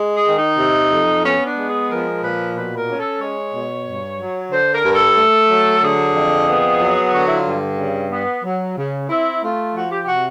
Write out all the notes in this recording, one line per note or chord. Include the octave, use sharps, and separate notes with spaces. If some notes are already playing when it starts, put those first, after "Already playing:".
Already playing: G#3
G#4
D#3
D#4
C3
F2
B3 C#4
D4
G#3
G#4
F3 A#4
A#2 B4
B2 B4
A#4
C#4
A4
G#3 C#5
B2
G2
F#3
D3 C5
A#4
G2
A4
A3
F#3
D3 G#4
F2
B3
F#3
D3 F#4
E4
F4
G2
C#3
B3
F#3
C#3
C4 E4
A3 F4
F3 F#4
G4
G4
C3 F#4